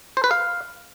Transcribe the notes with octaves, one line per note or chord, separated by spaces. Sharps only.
C5
B4
F5